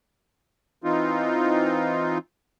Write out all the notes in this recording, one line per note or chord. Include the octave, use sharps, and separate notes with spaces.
E3 C4 D#4 F4